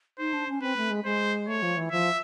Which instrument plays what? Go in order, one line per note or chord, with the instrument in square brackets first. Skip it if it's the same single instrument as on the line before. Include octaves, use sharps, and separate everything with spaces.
[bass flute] D#4 [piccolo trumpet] C5
[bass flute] D4
C#4
[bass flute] C4 [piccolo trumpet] B4
[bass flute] A3
G#3
[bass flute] G#3 [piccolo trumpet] C5
[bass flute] A3 [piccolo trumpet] C#5
[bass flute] F3
E3
[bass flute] F3 [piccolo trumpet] E5